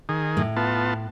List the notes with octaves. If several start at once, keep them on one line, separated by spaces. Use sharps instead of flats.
D#3 G#4
A2
B3 F4 A5